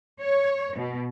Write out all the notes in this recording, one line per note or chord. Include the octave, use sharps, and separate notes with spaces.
C#5
B2